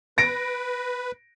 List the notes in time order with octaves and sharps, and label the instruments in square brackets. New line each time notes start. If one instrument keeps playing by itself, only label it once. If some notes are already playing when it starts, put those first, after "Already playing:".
[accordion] B4 [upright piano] A#6 D7